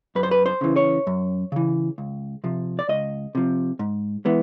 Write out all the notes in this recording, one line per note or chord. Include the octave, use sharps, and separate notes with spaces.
F#2 B4
C5
B4
C5
C#3 E3
C#5
F#2
C#3 E3
C#2
C3 F3
D5
C#2 D#5
C3 F3
G#2
E3 G#3 B3